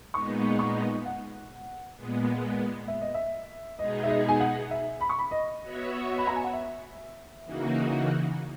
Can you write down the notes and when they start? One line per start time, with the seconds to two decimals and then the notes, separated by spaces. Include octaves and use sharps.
0.14 A#2 G#3 B3 D#4 C#6
0.59 C#6
1.06 F#5
1.96 A#2 G#3 B3
2.88 E5
3.01 D#5
3.14 E5
3.79 B2 G#3 B3 D#4 G#4 D#5
4.03 E5
4.09 D#5
4.28 G#5
4.40 F#5
4.71 E5
5.01 B5
5.09 C#6
5.18 B5
5.31 D#5
5.62 B3 F#4 C#5 E5
6.18 B5
6.27 A#5
6.36 G#5
6.44 F#5
6.53 E5
7.45 C#3 E3 A#3 D#4 F#4